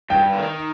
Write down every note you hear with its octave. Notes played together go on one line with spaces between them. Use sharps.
G2 G5
D3
D#3